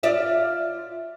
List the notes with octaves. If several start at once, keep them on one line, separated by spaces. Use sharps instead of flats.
F4 D5 E5